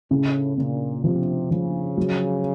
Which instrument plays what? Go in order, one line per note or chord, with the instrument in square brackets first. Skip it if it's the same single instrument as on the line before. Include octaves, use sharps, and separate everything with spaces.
[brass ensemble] A2 [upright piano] C#3
[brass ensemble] A#2 [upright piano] C#3
[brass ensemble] C3 [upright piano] F3
[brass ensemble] C#3 [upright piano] F3
[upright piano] F#3